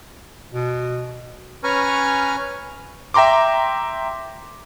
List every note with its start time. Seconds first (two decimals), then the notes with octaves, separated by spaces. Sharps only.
0.54 B2
1.64 C#4 B4 G#5 A#5 C#6 F6
3.14 E5 G5 A#5 C6 D6